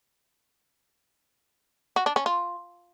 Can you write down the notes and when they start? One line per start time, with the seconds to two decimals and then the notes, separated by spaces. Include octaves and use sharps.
1.96 F#4
2.06 D4
2.16 C#4
2.26 F4